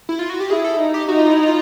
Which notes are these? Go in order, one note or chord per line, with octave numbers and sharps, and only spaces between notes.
E4
F4
F#4
G4
E4 G#4
A4
D#4
G4
D#4 F#4
F4
E4
F4